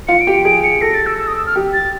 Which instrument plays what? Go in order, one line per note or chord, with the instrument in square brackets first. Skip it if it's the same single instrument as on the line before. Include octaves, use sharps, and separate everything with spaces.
[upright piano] F4 [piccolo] C#7
[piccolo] D7
[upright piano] G4
[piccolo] D7
[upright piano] G#4 [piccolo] D7
[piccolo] C#7
[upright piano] A4 [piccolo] A#6
[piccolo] A6
E6
E6
D#6
E6
F6
[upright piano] G4
[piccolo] A6